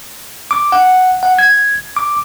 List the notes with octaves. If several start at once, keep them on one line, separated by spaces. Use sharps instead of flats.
D6
F#5
F#5
G#6
D6